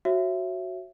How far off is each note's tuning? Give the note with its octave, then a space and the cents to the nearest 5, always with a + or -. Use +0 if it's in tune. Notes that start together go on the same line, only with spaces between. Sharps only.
F#4 +0 C#5 -25 E5 +20